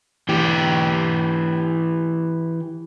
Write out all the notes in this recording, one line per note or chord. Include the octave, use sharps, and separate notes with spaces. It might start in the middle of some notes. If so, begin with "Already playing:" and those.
E3 G4